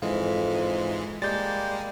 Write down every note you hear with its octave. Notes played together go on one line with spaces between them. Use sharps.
F2 G#2 E3 G#3 F5
G3 G#3 A#3 G6 A6